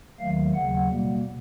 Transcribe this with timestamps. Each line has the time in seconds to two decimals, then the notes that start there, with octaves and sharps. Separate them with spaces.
0.20 D#2 D#3 F#3 A3 F5
0.53 D#2 C#3 F#3 F#5
0.88 B2 G3 A#3